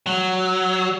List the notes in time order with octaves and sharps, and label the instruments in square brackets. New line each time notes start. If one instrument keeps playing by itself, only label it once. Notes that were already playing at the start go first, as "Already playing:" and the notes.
[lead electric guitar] F#3